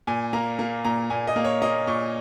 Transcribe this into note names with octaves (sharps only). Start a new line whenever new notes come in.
A#2 G#5
A#3 A#5
A#3
A#2 A#5
A#2 G#5
D#5
A#3
C#5
A#3 D#5
A#2 C#6